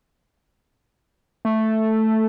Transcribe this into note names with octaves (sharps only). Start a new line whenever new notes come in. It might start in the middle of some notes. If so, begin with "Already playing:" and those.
A3